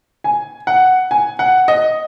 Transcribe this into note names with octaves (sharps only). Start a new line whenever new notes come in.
G#5
F#5
G#5
F#5
D#5